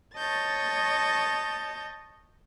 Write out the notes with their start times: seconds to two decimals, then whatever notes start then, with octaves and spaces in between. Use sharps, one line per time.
0.16 C#5 D#5 A5 G6 A6